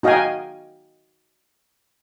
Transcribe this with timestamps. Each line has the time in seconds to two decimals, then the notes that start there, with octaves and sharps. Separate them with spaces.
0.03 D#4 F#4 D#5 F5 G5 G#5